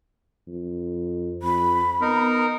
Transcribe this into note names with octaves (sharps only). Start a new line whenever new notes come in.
F2
F2 B5
B3 D#4 A#4